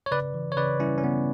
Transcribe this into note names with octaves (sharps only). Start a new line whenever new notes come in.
C#5
C#3 B4 D5
E3
C#5
C#3 B4 D5
G3 C#4 E4
C#4
C#3 B3